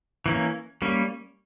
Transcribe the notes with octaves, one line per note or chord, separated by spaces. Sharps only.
E3 A#3 C#4
G3 A#3 C#4